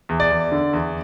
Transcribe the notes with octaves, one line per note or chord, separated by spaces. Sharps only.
E2
D5
E2
D3
E2